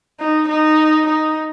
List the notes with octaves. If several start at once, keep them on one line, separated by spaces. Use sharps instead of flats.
D#4
D#4
D#4